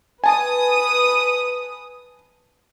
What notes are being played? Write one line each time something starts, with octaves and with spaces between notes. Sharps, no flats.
B4 G#5 A5 D#6